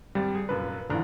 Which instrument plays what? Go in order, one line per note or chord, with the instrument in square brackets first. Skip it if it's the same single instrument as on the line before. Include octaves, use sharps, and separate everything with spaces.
[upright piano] G#1 C4 A6 [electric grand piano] G3
[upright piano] G#4
[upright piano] F1 F#2 A#2 [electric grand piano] B4
[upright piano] A#1 G#2 F3 [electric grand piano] D3 E3